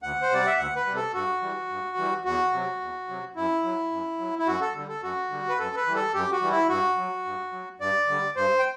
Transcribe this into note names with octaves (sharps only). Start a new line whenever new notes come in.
D2 F#5
C5
C3 G3 D5
E5
D2 F#5
B4
C3 G3
A4
G2 F#4
E3 G3
G2
E3 G3
E2 F#4
C3 F#3
E2
C3 F#3
F#2 E4
F#3
F#2
F#3
E4
F#2 F#4
A4
D3 G3
A4
F#2 F#4
D3 G3
B4
F#2 A4
B4
E3 G3
A4
F#2 G4
F#4
E3 G3
E4
G2 F#4
F#3
G2
F#3
G2 D5
D3 G3
G2 C5
G5